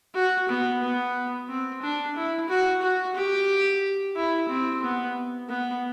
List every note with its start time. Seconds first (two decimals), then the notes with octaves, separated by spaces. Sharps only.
0.15 F#4
0.48 B3
0.82 B3
1.48 C4
1.82 D4
2.16 E4
2.49 F#4
2.82 F#4
3.15 G4
4.16 E4
4.49 C4
4.82 B3
5.49 B3